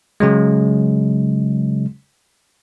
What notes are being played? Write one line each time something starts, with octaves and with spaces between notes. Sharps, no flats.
C#3 F#3 G#3